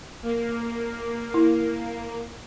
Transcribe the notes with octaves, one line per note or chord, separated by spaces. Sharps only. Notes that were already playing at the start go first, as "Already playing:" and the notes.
A#3
E4